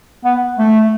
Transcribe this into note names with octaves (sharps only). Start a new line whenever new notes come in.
B3
A3